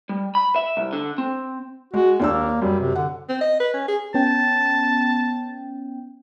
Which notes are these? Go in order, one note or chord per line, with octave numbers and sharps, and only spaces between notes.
G3
B5
E5
C2
D3
C4
G#3 F#4
D#2 A#3 D4 E6
F#2 G3
C3
D3 F#5
C4
D#5
B4
C#4
G#4
B3 C#4 G5 A5